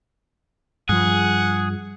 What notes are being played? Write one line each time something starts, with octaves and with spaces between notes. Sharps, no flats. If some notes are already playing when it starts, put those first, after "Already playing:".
G2 F3 G#4 F#5